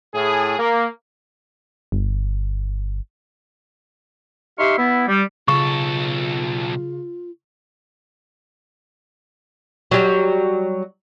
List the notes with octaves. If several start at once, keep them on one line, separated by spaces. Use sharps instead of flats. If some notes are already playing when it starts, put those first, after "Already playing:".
A2 G#4
A#3
G1
D#4 G4 E5 F5 C6 C#6
B3 E4
G3
B1 C#3 F4 A4 C#6
F#3 G3